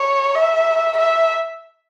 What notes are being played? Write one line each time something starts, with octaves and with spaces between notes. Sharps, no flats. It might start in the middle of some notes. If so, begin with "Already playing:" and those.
Already playing: C#5
E5
E5